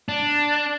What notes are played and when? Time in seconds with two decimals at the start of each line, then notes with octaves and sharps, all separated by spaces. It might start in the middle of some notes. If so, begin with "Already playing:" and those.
0.09 D4